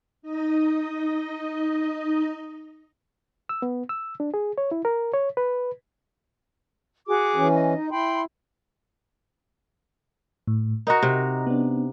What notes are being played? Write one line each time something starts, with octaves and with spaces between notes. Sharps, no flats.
D#4 D#5
E6
B3
E6
D4
G#4
C#5
E4
A#4
C#5
B4
F#4 G#4 D6
E3 C#4
D#5
D#4
E4 G5 B5 C6
A2
D#4 F#4 A#4 D#5 A#5
C3
B3 D4